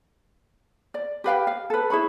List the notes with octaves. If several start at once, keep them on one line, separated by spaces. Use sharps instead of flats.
D5
G4 B4 F5 G5
F5
A4 B4
E4 G#4 C#5 B5